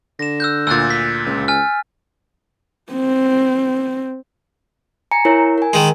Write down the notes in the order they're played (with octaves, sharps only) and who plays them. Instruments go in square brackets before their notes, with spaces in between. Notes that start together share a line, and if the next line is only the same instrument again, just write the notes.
[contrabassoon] D3 [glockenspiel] A#6 E7
[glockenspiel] E6 F#6 G6
[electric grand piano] D2 A#2 [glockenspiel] E6 F#6 A6
[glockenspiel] B6
[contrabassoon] C#2
[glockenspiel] G#5 F6
[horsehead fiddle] C4
[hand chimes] G#5 A#5 C#7
E4 A#4 C#5
A#4 G#5
[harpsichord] D#3 G#3